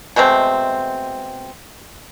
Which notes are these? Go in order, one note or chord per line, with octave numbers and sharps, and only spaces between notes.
B2 G#3 A3 C4